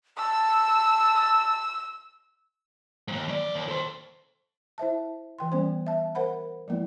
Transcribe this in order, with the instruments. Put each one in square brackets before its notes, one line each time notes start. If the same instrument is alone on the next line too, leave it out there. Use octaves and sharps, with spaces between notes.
[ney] A5 [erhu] E6
[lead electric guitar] D#2 G#2
F#2 D5
D#2
A4 C5
[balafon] E4 C5 E5 A5
E3 G5 C6
G3 B3 C#4 C5
E5 A5
A#4 C5 F#5 B5
F3 G#3 A#3 B3 E4